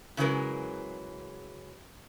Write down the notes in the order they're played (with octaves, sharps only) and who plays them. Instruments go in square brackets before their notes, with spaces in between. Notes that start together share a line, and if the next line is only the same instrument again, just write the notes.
[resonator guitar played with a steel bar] C#3 E3 F#3 G#3 A#4